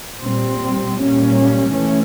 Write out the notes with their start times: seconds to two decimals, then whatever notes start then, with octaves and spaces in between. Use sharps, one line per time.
0.22 A#2 G3 C4
0.98 A#2 G3 A#3 C#4
1.73 E3 A3 C#4